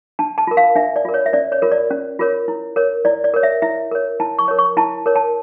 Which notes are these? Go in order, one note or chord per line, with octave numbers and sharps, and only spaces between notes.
D4 A5
A5
F4 A#4
F5
D4 E5
D5
F4 A#4
C#5
E5
C#4 D5
C#5
F4 A#4 C#5
D5
C#4
F4 A#4 C#5
E4
A#4 C#5
E4 D5
D5
A#4 C#5
E5
E4 E5
A#4 C#5
E4 A5
C#6
A#4 C#5
C#6
E4 A5
A#4 C#5
A5